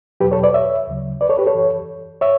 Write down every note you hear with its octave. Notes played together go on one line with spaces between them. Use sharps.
E2 B2 F#3 G4 B4
A4 C#5
B4 D5
C#5 E5
D2 C#3 F#3
B4 D5
A4 C#5
G4 B4
A4 C#5
F#2 E3
C#5 E5